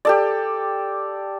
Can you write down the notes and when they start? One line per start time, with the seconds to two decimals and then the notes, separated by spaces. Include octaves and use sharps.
0.05 G4 A4 D5